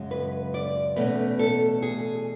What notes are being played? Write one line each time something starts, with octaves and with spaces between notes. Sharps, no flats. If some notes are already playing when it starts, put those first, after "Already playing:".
Already playing: F#2 C#3 G#3
B4
D5
E2 B2 A3 C#4 B4
A4
G#4